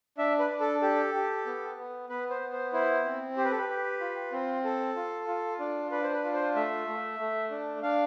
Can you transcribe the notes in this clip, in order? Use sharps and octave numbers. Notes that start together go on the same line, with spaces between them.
D4 E5
B4
D4
A4
G4 A4
G4
B3
B3
B3 B4
C5
B3
C5
E4 C5
C4
G4 C5
B4
A4
B4
G4
F4
C4
A4
F4
F4
D4
D4 B4
C5
B4
F4
C5
A3 E5
A3
A3
D4
D4 F5